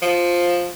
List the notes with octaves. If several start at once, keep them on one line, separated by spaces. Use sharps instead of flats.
F3